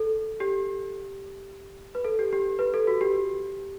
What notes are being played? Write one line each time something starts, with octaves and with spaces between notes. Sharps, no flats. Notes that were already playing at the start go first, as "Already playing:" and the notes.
Already playing: A4
G4
B4
A4
G4
G4
B4
A4
F#4
G4